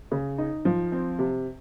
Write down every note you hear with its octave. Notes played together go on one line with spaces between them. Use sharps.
C#3
D#4
F3
C4
C3